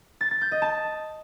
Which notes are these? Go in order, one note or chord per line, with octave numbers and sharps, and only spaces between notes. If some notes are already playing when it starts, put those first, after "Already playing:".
A6
A6
G6
D#5
A5